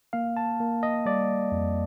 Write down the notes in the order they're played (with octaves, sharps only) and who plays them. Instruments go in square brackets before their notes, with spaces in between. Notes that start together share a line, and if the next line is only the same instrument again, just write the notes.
[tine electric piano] A#3 F5
A5
A#3
D#5
G3 D5
F2